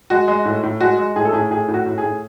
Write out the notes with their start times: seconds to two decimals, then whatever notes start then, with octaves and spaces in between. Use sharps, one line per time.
0.10 G#3 F#4
0.28 G#3
0.45 A2
0.63 A2
0.81 G#3 F#4
0.98 G#3
1.16 A2 G#4
1.25 A4
1.33 A2 G#4
1.50 A2 G#4
1.68 A2
1.74 F#4
1.86 A2
1.98 G#4
2.03 A2